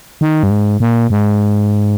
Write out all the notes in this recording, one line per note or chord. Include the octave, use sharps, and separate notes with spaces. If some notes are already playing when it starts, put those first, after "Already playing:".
D#3
G2
G#2
A#2
G#2